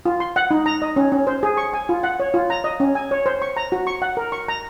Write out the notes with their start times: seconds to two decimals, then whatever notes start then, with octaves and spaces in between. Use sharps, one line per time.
0.05 F4
0.20 C6
0.36 F#5
0.51 D#4
0.66 A#5
0.82 D#5
0.96 C#4
1.12 C#4
1.27 C5
1.43 G#4
1.57 C#6
1.73 G#5
1.89 F4
2.03 F#5
2.20 C#5
2.34 F4
2.50 A#5
2.64 D#5
2.80 C#4
2.95 G#5
3.11 C#5
3.26 C5
3.42 C#6
3.56 A#5
3.72 F#4
3.87 C#6
4.02 F#5
4.17 A#4
4.32 C#6
4.48 A#5